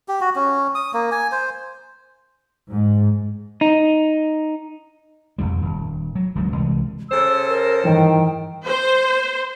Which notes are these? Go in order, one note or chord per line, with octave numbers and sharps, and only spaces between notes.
G4
F#4
C#4
D#6
A#3
G#5
C5
G#2
D#4
E1 A#1 F2 G3
D#1
F#3
D#1 C#2 G2 F#3
C2 E3 G3 G#3
C#3 A4 C5 E6
A#4
G2 D#3 E3 G5
C5